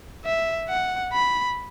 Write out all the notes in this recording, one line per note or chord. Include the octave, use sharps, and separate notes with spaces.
E5
F#5
B5